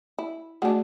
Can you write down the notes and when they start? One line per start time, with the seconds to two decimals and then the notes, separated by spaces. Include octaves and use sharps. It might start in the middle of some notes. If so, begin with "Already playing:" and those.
0.19 E4
0.62 G#3 A3 D4 F#4 F#5